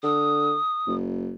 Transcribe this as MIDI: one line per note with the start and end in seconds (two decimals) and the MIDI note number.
0.04 0.55 50
0.04 0.95 87
0.87 1.35 30